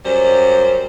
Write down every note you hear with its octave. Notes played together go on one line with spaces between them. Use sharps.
F#2 F#3 G3 C5